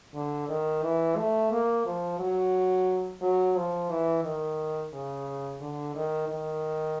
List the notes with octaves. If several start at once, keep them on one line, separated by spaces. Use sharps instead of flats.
D3
D#3
E3
A3
A#3
F3
F#3
F#3
F3
E3
D#3
C#3
D3
D#3
D#3